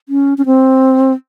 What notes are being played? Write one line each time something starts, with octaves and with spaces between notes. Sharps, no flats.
C#4
C#4
C4